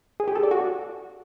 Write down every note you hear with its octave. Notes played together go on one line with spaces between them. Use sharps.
G#4
G4
A4
D5
F#4